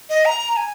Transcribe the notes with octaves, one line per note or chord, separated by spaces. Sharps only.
D#5
A#5
G#5